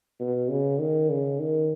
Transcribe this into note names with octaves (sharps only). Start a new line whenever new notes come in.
B2
C#3
D#3
C#3
D#3